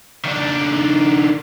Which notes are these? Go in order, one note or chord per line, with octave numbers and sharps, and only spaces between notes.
D#3 D4